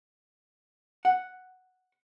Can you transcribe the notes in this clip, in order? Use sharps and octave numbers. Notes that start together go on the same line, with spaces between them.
F#5